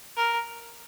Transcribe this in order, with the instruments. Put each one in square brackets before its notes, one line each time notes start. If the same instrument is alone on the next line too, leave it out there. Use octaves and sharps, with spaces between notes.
[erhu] A#4